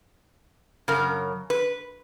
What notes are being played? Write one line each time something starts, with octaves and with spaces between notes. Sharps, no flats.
F#2 C#3 A#4
B4